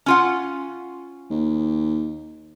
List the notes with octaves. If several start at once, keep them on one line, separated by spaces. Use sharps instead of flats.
C#4 F4 F#5
D#2